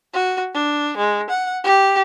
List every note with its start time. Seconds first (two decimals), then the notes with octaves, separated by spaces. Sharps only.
0.14 F#4
0.54 D4
0.97 G#3
1.30 F#5
1.64 G4